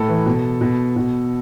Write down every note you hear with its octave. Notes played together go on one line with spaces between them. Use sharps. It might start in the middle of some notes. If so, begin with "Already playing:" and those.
Already playing: A2 A4
E3
B2
B2
B2